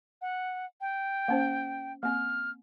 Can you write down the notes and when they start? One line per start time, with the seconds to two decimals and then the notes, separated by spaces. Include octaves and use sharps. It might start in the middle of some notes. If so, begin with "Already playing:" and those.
0.22 F#5
0.81 G5
1.28 A#3 C#4 C5
2.03 A#3 C4 F6